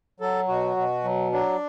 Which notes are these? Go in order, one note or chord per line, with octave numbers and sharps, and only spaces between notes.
F#3 A4
B2 F#4
B2
F#3
F#3 D4